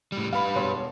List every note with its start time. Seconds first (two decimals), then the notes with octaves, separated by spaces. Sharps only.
0.12 A2 G3
0.33 G3 B4 F5 B5
0.55 E1 C#5 C6